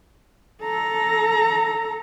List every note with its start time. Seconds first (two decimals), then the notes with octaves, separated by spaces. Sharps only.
0.63 A4 A#5